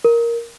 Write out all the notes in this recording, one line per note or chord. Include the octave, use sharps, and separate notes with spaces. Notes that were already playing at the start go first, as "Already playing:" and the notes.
A#4